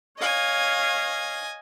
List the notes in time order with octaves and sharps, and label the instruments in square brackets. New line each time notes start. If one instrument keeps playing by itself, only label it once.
[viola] C#5 F5 [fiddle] D#5 G#5